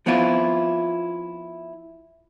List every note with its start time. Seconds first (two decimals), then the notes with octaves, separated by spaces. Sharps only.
0.06 F3 B3 C4 E4 F4